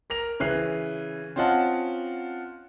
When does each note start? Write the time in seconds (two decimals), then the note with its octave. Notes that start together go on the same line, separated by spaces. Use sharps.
0.10 A#4 A#6 F7
0.40 C#3 E3 F#6 C7
1.36 C4 C#4 F4 D#5 F#5 A5